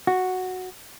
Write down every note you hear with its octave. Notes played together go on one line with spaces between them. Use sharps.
F#4